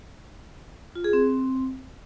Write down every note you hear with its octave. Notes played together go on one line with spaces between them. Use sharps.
F4
G#4
C4